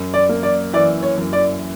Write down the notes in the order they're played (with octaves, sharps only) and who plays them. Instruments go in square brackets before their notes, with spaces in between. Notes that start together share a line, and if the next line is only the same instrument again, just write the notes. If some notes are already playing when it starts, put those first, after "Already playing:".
Already playing: [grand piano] F#2
[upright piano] D5
[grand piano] A#3
[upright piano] D5
[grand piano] E3 [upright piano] D5
[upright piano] C#5
[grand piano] F#2
[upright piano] D5